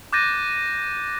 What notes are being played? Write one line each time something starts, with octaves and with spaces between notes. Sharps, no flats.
D6 F#6 G6 A6 A#6 D#7